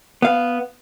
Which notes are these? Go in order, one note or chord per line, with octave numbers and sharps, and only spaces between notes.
B3 F5